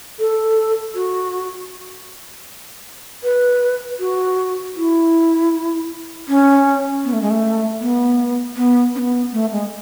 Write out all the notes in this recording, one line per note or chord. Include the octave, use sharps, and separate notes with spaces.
A4
F#4
B4
F#4
E4
C#4
B3
A3
G#3
A3
B3
B3
C#4
B3
A3
G#3